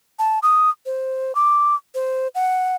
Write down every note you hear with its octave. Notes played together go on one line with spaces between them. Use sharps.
A5
D#6
C5
D6
C5
F#5